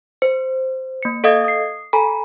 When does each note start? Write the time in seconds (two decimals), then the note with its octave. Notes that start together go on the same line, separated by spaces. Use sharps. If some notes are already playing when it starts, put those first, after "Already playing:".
0.22 C5
1.03 A#3 C#7
1.24 A4 D#5 F5 D#6 G#6
1.44 D#6 C7
1.93 A4 G#5 A#5 B5